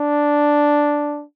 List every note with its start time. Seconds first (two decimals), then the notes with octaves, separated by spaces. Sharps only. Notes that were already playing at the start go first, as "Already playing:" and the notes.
Already playing: D4